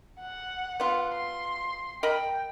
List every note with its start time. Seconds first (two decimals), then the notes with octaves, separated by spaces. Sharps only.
0.20 F#5
0.80 B3 F4
1.13 C6
2.03 A#4 D#5 G5 B5